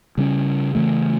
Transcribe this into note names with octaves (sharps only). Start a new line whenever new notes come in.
C#3 G3 C#4
C#3 E3 A3